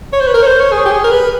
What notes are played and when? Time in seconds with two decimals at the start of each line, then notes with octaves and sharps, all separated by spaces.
0.13 C#5
0.20 C5
0.27 B4
0.34 A#4
0.43 C#5
0.46 C5
0.60 C#5
0.72 G#4
0.85 G4
0.91 G#4
1.04 A#4
1.11 B4